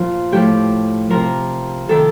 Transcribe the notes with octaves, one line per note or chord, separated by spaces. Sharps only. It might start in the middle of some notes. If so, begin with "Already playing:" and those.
Already playing: A#2 F3 F4
A2 F3 G4
C3 F3 A#4
C3 D#3 A4